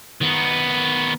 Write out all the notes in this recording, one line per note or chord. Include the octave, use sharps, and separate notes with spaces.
D#3 B3